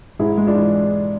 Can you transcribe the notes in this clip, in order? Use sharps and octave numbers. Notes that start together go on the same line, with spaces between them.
G#2 E4 G#4
G#3
D4 F4
E3